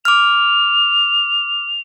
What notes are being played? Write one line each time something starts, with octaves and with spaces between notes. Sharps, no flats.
D6 F6 F7